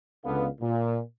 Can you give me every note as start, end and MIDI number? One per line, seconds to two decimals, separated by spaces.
0.25 0.47 37
0.25 0.47 50
0.25 0.47 59
0.25 0.47 77
0.61 0.99 46